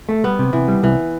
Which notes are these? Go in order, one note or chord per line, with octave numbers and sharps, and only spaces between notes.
A3
G3 B3
C3
C3 E3
G3
C2 E3